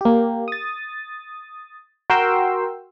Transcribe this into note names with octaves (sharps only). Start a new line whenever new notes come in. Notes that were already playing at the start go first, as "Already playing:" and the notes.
A#3 G4
D#6 A6
F#4 A#4 G5 C6 E6